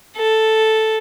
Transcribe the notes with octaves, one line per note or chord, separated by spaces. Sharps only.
A4